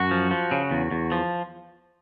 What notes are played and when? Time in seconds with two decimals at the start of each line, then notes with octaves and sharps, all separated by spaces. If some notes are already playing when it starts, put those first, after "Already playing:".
Already playing: F#2 F#4
0.11 F3
0.31 F3
0.51 C#3
0.71 E2
0.91 E2
1.12 F3